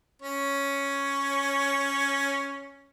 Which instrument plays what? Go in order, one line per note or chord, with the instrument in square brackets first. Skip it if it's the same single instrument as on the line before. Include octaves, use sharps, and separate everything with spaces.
[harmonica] C#4 C#5